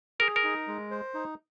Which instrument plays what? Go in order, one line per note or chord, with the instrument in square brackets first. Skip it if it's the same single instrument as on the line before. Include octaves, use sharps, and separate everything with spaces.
[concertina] G#4 [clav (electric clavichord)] A#4
[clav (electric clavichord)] A#4
[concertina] D#4
G#3
C5
D#4